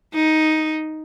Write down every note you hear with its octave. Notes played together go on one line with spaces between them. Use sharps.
D#4